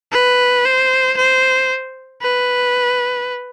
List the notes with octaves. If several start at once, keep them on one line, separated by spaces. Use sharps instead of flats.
B4
C5
C5
B4